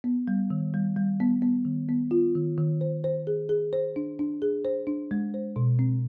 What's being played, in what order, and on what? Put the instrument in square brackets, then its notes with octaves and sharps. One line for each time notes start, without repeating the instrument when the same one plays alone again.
[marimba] B3
G3
D#3
G3
G3
B3
B3
D#3
B3
F4
D#3
D#3
C5
C5
G#4
G#4
C5
D4
D4
G#4
C5
D4
G#3
C5
B2
C4